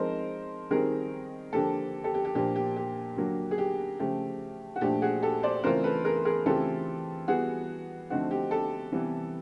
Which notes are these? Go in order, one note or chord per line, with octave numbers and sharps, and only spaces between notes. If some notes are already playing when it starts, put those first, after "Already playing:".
Already playing: F3 G#3 C4 D#4 A#4 C5
D#3 G3 C4 G#4 A#4
D3 F3 A#3 G4 A4
G4 A4
G4
G4
A#2 F3 A#3 D4 G4
G4
G4
D3 F#3 A#3
G#4
G4
C#3 F3 A3 G4
F#4
A#2 F3 A3 D4 G4
F#4 G#4
G4 A4
C5 D5
C#3 E3 A3 C4 F4 A#4 C5
A4 B4
G#4 A#4
G#4 A#4
C#3 E3 A3 C4 F4 G4 A4
E3 G3 B3 F#4 G#4
D3 F3 A3 C4 D#4 F#4
G4
G4 A4
C3 E3 G3 B3